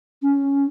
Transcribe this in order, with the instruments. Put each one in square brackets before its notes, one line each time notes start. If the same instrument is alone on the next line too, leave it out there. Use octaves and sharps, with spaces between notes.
[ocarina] C#4